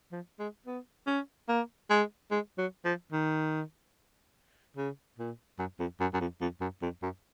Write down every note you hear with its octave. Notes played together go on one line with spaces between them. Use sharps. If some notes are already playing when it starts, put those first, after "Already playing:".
F3
G#3
B3
C#4
A#3
G#3
G#3
F#3
F3
D#3
C#3
A#2
F#2
F2
F#2
F#2
F2
F2
F#2
F2
F#2